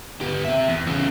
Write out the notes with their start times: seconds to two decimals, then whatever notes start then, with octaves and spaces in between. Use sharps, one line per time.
0.21 B3 G4
0.45 C4 E5
0.68 E2
0.87 E2 C#3